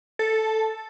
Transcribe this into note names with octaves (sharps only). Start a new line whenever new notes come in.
A4